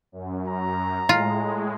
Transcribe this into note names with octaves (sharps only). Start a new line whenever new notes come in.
F#2
A#5
A2 G#3 F4